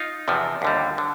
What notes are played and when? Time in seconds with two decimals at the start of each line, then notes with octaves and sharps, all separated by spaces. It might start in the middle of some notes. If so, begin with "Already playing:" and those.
Already playing: D#4 F4
0.28 E2 C3 F3
0.62 D#2 D3 G3
0.98 D3